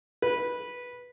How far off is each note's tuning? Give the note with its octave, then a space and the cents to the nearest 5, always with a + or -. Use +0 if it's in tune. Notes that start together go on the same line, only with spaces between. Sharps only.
B4 -10